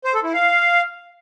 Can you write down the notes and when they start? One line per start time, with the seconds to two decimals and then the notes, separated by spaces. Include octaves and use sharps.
0.04 C5
0.14 A4
0.24 E4
0.33 F5